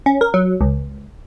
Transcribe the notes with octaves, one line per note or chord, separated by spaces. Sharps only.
C#4
A#4
F#3
C#2